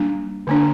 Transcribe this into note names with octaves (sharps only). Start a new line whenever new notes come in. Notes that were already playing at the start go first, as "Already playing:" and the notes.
Already playing: G3 A#3 D4
D3 A#3 D4